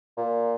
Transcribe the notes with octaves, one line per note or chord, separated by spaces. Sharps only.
A#2